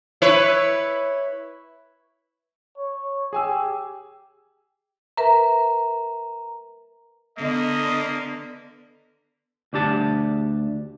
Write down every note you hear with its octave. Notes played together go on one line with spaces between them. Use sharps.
E4 B4 C#5
C#5
G4 G#4 G#5 E6
A#4 B4 E5 A#5
D3 A#3 B3 D#5
D2 D4 G4 A5